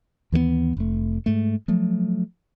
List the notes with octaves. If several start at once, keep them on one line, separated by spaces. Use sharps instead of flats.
D#2 E3 G#3 B3
F1 A3
G#2 A3
F3 F#3 A3